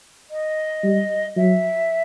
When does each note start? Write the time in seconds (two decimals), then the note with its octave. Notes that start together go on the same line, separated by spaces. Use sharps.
0.30 D#5
0.83 G3
1.36 F#3 E5